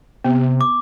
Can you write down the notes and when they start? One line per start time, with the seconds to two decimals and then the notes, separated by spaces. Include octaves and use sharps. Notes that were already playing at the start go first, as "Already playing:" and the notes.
0.24 C3 B3
0.61 D6